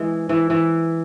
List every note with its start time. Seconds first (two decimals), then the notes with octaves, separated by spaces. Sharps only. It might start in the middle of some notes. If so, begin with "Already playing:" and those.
Already playing: E3 G#3
0.29 E3
0.50 E3